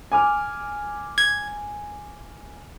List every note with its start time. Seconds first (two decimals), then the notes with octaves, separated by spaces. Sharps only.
0.12 G#5 D6 F6
1.18 G#6